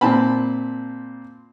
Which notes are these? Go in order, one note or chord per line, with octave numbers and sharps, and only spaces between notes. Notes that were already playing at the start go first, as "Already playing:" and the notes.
A#2 C4 A5 B5